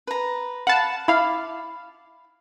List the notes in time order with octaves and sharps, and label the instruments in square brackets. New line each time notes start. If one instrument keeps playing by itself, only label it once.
[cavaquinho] B4 A#5
[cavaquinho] F5 B5 [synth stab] F#5 A5
[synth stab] E4 F5 [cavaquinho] B5 D6